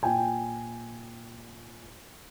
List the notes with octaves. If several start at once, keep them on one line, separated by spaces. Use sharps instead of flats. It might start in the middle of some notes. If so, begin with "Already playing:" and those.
A#2 G5 G#5